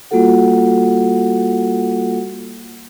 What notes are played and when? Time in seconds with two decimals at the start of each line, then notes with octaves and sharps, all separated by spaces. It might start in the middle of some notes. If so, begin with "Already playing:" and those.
0.11 G3 A#3 F4 F#4 A4 F#5